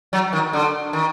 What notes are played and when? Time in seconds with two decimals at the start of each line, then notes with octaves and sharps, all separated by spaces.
0.13 F#3
0.33 D#3
0.53 D3
0.93 D#3